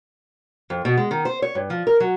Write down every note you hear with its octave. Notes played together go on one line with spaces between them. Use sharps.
F2
B2
G#3
D#3
C5
C#5
G2
F3
A#4
F#3